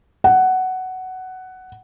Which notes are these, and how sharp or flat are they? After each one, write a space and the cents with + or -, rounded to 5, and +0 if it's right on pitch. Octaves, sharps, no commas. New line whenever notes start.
F#5 +10